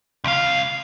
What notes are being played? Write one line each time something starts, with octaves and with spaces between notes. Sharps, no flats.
C#2 F5